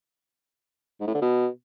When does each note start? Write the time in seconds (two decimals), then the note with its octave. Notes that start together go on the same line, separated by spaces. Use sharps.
1.00 G#2
1.07 A2
1.14 D3
1.22 B2